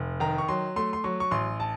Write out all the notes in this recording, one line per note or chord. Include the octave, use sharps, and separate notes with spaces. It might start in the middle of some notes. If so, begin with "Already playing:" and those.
Already playing: F1
D#3 A#5
C#6
F#3 C6
A3 C6
C6
F#3 C#6
C#6
A1 C6
A5